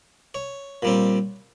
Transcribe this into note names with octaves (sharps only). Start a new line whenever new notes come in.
C#5
A#2 G3 C4